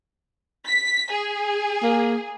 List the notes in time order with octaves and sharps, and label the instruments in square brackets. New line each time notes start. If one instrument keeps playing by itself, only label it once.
[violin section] B6
G#4
[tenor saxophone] A#3